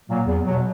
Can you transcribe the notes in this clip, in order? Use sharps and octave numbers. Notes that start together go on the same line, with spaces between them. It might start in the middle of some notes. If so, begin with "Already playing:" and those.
A#2 F#3 A#3
E2
B2 F#3